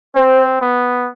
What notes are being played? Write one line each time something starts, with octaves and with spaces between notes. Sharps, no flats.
C4 C5
B3